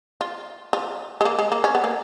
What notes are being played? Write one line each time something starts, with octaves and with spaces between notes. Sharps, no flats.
F4
F4
G#3
A#3
G#3
A#3
C#4
B3
A#3